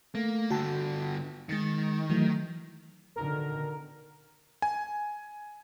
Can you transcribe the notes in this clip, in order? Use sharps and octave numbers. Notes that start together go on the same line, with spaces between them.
A3 A#3
G2 D3 F#4 G5 A5
D#3 G#3 A6 C#7
E3 F#3 A3
B2 D3 D#3 A#4
G#5